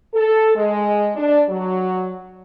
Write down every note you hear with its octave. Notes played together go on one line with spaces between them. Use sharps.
A4
G#3
D4
F#3